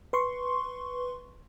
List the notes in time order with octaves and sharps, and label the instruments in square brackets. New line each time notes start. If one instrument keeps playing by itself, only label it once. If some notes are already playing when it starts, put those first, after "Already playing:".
[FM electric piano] B4 C6 C#6